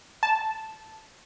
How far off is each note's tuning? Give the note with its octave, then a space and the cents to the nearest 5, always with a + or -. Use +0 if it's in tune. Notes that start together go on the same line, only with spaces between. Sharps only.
A5 -15